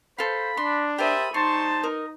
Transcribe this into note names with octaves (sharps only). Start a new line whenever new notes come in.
A4 C5 F5 B5
D4 C6
G4 A#4 C5 E5 A5 B5 D#6
G3 D#4 C5 A5 C6 C#6
A#4 D#5